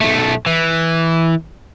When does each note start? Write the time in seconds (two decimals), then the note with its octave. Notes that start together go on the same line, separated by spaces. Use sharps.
0.01 B1 A3
0.47 E3